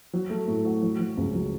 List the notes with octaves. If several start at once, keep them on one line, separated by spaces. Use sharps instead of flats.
F#3
A3
A2
F#4
F#3
F#3
C#2
F#3